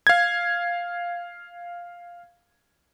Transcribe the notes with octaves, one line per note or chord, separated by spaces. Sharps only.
F5 G#6